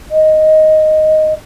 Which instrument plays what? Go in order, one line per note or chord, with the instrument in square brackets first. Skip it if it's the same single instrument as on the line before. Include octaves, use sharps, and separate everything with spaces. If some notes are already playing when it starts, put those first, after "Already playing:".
[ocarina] D#5